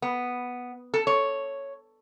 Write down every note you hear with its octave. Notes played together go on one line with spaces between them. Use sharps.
B3
A4
C#5